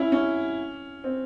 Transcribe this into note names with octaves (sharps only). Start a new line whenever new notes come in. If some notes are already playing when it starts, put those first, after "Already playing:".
Already playing: C#4 E4
C#4
C4